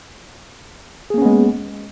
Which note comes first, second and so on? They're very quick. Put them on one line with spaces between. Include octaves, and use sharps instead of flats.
G#4 A#3 C#4 B3 G#3